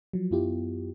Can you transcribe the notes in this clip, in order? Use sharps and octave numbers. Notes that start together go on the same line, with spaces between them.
F3 F#3
F#2 B3 E4 F4 G4